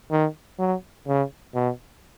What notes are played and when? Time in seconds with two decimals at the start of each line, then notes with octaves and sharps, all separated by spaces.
0.11 D#3
0.59 F#3
1.07 C#3
1.55 B2